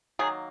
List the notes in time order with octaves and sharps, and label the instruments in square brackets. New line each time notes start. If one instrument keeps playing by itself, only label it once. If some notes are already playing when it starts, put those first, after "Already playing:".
[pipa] D#3 F#3 A#3 G#4